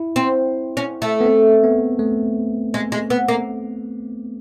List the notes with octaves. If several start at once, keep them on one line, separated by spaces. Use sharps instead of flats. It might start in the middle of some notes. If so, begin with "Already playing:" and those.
Already playing: E4
C4
C#4
A3
B3
C4
B3
A3
G#3
G#3
B3
A#3